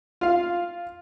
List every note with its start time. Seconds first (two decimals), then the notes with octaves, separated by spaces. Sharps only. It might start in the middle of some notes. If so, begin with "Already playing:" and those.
0.21 F4 F5